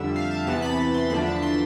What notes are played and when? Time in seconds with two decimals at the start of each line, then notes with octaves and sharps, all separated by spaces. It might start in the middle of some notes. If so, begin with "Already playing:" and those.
Already playing: F2 D3 G3 E5
0.16 F5
0.31 A5
0.47 E2 C3 E3 B3 A5
0.62 B5
0.79 B5
0.94 C6
1.10 E2 D3 F3 A3 D4 B5
1.26 A5
1.42 C6